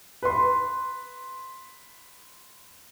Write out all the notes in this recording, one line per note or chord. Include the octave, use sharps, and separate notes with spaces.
B4 C6